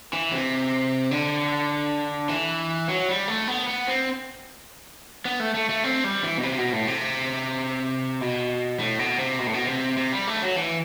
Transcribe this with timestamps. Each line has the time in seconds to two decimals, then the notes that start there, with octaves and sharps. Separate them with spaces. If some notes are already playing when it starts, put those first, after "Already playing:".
0.13 E3
0.32 C3
1.11 D3
2.29 E3
2.89 F#3
3.08 G3
3.28 A3
3.48 B3
3.68 B3
3.88 C4
5.25 B3
5.40 A3
5.54 A3
5.69 A3
5.84 C4
6.04 G3
6.24 E3
6.38 B2
6.43 C3
6.58 B2
6.73 A2
6.87 C3
8.21 B2
8.79 A2
8.99 B2
9.19 C3
9.39 B2
9.47 A2
9.54 B2
9.68 C3
9.97 C3
10.12 G3
10.27 A3
10.42 F#3
10.57 E3